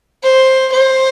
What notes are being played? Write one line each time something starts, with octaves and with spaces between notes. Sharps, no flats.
C5
C5